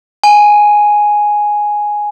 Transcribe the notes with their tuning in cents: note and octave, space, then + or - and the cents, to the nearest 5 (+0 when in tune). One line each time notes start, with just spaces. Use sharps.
G#5 +0